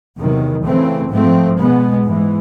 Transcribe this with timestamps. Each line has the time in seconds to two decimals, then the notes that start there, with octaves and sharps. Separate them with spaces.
0.18 E2 C3 D#3 F#3
0.64 C#3 E3 A3 C4
1.10 G#2 F3 A3 C4
1.57 B2 G#3 B3
2.04 G#2 E3 G#3